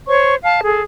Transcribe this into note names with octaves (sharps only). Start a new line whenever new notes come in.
C5 C#5 C#6
F5 A5
G#4 A4